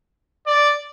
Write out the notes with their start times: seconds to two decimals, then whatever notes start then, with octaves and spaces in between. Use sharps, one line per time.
0.47 D5